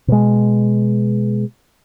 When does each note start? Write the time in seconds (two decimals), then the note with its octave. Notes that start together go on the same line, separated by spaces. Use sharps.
0.08 B2 G#3